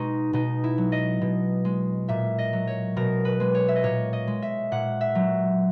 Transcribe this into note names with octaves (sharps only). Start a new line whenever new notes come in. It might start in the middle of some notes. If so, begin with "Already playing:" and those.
Already playing: B2 G#3 D#4 F#4
B2 D#4
E4
F#3
D#5
B2
G#3
A#2 E5
D#5
F#3
C#5
B2 A#4
B4
G#3
C#5
E5
D#5
A#2 C#5
D#5
G#3
E5
A#2 F#5
E5
F#3